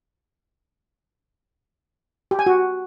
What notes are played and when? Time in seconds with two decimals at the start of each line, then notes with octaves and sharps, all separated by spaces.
2.31 G4
2.39 G#5
2.46 F#4